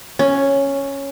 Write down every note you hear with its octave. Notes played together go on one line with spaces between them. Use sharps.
C#4